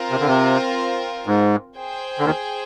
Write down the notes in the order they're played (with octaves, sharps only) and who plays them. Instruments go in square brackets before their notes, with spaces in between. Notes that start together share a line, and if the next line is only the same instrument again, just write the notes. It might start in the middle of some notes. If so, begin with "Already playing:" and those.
Already playing: [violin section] C4 F4 A#4
[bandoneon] C3
D3
C3
G#2
[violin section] G#4 C5 G5
[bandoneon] D3
D#2 D#3